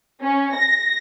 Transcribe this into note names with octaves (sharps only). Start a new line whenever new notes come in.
C#4
A#6